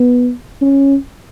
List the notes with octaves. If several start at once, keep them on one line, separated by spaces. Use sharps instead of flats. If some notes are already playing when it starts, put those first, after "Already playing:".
Already playing: B3
C#4